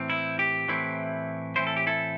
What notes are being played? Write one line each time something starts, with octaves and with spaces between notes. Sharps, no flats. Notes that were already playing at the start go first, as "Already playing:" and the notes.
Already playing: A2 E3 C4
E4
G4
A2 E3 C4 E4
A2 E3 C4 E4 C5
A4
G4
E4 A4